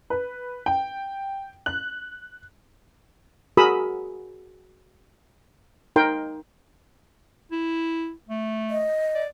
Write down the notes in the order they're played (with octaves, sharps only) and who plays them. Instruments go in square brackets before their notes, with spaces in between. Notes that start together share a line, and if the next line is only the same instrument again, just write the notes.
[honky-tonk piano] B4
G5
F#6
[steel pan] F#4 G#4 A#4 B5 D#6 E6
D#4 A#4 G5 C6
[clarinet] E4
A3
[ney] D#5
[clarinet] D5